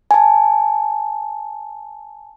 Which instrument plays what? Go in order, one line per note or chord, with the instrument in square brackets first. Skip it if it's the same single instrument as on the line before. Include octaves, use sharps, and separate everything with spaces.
[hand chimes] G#5 A5